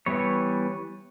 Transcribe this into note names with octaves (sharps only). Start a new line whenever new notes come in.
E3 G3 B3 C#5